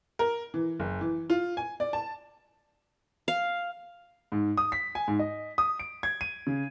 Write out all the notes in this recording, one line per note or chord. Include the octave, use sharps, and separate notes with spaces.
A#4
E3
F#1
E3
F4
G#5
D5
A5
F5
G#2
D#6
B6
G#5
G#2
D#5
D#6
D7
G#6
D#7
C#3